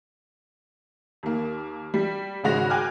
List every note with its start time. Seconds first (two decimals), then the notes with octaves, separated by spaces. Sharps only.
1.23 D#2 A#3
1.94 G3
2.44 G#1 C#3 G#3 F#4 A#6 F7
2.70 G5 G#5 D6 F6 F#6